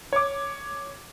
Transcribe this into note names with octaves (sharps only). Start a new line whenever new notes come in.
C#5 D6